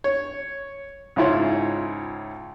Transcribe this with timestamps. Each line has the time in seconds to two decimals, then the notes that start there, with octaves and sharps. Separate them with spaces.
0.04 C#5
1.16 C#2 G#2 E4 F4 C#5